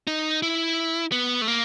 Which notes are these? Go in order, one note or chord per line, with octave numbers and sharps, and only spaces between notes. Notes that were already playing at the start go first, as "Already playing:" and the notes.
D#4
E4
B3
A3
A#3